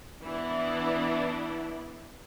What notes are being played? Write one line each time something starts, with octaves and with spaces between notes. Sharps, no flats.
E3 B3 D4 E4